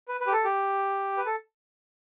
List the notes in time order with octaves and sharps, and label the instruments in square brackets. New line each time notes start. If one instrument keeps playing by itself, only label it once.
[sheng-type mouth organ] B4
B4
G4
A4
G4
B4
A4